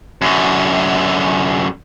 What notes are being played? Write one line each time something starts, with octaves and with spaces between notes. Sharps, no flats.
F#2 D3